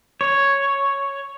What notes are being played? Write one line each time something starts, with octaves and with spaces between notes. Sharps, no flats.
C#5